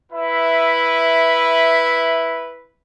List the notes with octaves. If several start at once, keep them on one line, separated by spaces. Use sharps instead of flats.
E4 B4 E5